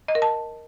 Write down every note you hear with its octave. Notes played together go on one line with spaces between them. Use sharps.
D#5
A#4
A5